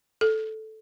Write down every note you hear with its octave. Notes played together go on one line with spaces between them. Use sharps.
A4